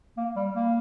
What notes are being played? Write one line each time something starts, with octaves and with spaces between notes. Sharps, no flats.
A#3
G3
A#3